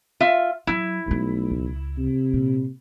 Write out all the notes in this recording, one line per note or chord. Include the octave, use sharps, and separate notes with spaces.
F4 E5
F#3 E4
B1 G3 A3
C#2
C3
A#2